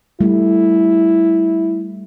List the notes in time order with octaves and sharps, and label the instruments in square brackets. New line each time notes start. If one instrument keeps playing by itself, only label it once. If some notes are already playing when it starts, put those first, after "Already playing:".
[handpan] G3 A3 [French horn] E4